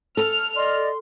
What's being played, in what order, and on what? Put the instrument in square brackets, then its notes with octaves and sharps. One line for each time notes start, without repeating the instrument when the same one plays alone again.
[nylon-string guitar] A4 [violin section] F6
[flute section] D5 D#5 [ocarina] C6